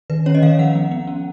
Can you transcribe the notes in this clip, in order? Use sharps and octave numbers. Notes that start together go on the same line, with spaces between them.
D#3 B4
C#4 C#5
D#5
D#3 F5
F3 F#5
B3
B3
C#4